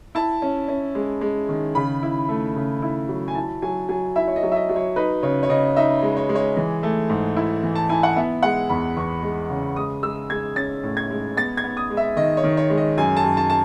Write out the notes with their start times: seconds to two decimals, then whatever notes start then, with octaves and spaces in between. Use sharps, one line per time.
0.15 E4 A5
0.42 C#4
0.68 C#4
0.95 G#3
1.21 G#3
1.49 D#3
1.75 C#3 B5
2.03 E4
2.29 A3
2.56 C#3
2.82 E4
3.09 F#3
3.28 G#5
3.35 E4 A5
3.62 F#3 G#5
3.89 F#3 G#5
4.16 E4 E5
4.28 C#5
4.36 D#5
4.43 F#3
4.52 E5
4.56 D#5
4.69 F#3
4.76 C#5
4.96 D#4 B4
5.22 C#3 C#5
5.43 C#5
5.49 C#3 D#5
5.76 D#4 E5
6.02 G#3
6.17 C#5
6.29 G#3
6.35 C#5
6.57 E3
6.83 A3
7.10 G#2
7.37 E4
7.63 E3
7.75 A5
7.89 E4 G#5
8.03 F#5
8.16 B3 E5
8.43 G#3 F#5
8.70 E2 B5
8.97 E2 C#6
9.23 G#3
9.50 C#3
9.76 G#3 D#6
10.03 G#3 E6
10.30 G#3 G#6
10.56 C#4 A6
10.83 A2
10.97 G#6
11.11 G#3
11.37 B3 A6
11.57 G#6
11.64 B3
11.77 D#6
11.90 G#3
11.97 E5
12.16 D#3 D#5
12.37 C#5
12.43 D#3
12.57 C#5
12.70 G#3
12.77 D#5
12.98 F#2 G#5
13.17 A5
13.24 F#2
13.37 A5
13.50 A5